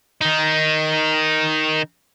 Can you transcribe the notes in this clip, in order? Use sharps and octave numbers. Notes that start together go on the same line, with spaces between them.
D#3 D#4